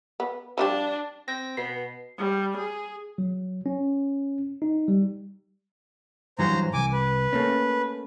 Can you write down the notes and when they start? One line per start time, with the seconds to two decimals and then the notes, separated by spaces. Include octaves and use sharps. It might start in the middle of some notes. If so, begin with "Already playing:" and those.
0.20 B3
0.58 F3 G3 D4 G4
1.28 C4 G6 A#6
1.57 B2 B3 C7
2.18 G3
2.58 G#4
3.18 F#3
3.66 C#4
4.62 D#4
4.88 G3
6.39 G2 E3 F#3 C5 A#5
6.74 C2 G#5 D6
6.93 B4
7.33 A3 A#3 C#4